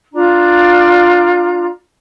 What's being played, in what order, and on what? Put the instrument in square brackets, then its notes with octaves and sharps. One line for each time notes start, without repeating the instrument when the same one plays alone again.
[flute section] D4 F4 A#5